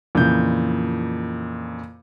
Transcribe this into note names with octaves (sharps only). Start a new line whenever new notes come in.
F2 A#2 C#3 E3 G6